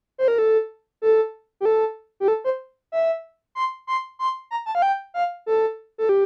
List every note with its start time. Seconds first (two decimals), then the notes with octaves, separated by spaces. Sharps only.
0.18 C5
0.28 A#4
0.38 A4
1.02 A4
1.61 G4
1.65 A4
2.20 G4
2.28 A4
2.44 C5
2.92 E5
3.55 C6
3.87 C6
4.19 C6
4.51 A#5
4.66 A5
4.75 F5
4.82 G5
5.14 F5
5.46 A4
5.98 A4
6.09 G4